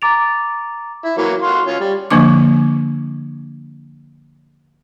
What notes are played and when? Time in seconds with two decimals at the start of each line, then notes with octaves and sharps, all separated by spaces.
0.02 A#5 D6 A6 D7 F7
1.05 E4
1.18 E3 F#3 A#3
1.42 F#4 F5 C6
1.67 C#4 F4
1.80 G3
2.10 D3 F3 A#3 D4 D6